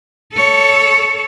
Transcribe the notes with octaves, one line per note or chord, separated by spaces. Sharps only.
A4 C#5